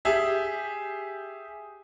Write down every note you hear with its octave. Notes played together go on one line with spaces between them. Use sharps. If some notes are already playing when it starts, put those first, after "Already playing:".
G4 G#4 E5